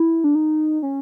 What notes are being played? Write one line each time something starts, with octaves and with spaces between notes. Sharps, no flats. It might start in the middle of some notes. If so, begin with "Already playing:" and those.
Already playing: E4
D4
D#4
C#4